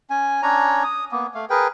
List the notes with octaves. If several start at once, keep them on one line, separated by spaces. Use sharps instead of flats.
C#4 G#5
C#4 D4 C#5 A#5
D#6
A#3 B3
A3 F5
G#4 A#4 B4 G5